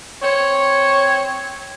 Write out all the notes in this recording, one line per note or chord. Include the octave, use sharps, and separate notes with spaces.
C4 C#5